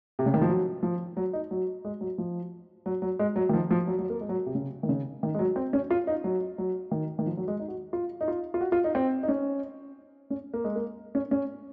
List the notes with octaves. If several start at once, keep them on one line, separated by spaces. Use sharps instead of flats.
C3
C#3
D#3
F3
F#3
F3
F#3
D#4
F#3
G#3
F#3
F3
F#3
F#3
G#3
F#3
D#3
F3
F3
F#3
F#3
A#3
G#3
F#3
C3
C#3
D#3
C#3
D#3
G#3
F#3
C4
C#4
F4
D#4
F#3
F#3
D#3
D#3
F3
F#3
G#3
D#4
F#4
F4
D#4
F4
F4
F#4
F4
D#4
C4
D#4
C#4
C#4
A#3
G#3
A#3
C#4
C#4